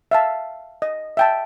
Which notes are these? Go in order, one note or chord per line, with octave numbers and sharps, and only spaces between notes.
E5 F5 A5
D#5
E5 G5 A5